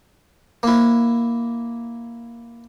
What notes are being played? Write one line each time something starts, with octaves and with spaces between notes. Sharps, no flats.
A#3 E4